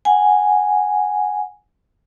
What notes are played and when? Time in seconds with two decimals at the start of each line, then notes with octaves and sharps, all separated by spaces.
0.05 F#5 G#5